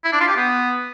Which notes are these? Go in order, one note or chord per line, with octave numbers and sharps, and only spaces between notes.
E4
D4
F4
G4
B3